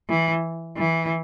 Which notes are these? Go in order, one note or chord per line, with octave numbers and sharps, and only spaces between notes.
E3
E3